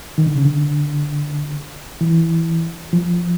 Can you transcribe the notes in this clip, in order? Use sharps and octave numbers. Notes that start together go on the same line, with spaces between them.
D#3
D3
C#3
D3
E3
F3